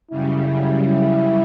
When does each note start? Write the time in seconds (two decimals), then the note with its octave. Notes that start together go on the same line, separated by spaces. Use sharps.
0.10 F#2 C#3 G3 E4
0.86 E4